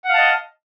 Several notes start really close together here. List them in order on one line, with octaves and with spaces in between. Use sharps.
F#5 F5 A5 D#5